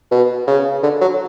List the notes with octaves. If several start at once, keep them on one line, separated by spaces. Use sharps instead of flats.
B2
C#3
D3
F#3